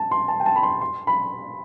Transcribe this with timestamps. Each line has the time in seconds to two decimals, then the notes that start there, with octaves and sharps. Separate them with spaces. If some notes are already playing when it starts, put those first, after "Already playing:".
Already playing: A5
0.11 C6
0.28 A5
0.40 G5
0.46 A5
0.56 B5
0.63 C6
0.81 C6
1.07 B5